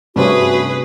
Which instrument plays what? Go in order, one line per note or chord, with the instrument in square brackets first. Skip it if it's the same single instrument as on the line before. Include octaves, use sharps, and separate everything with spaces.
[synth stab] G2 C3 [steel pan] A3 C#4 D4 [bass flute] F#4 [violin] G#4 B4